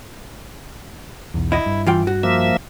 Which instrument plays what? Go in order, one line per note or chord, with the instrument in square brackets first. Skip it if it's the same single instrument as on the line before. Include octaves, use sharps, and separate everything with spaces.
[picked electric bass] B1 E2
[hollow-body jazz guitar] E4 D#5
[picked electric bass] G2
[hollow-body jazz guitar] E3 F4 G5
F#4
[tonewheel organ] F3 A#3 E5